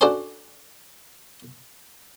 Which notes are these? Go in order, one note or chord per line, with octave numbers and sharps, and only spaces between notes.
D4 F#4 A4 C5 G#5 C6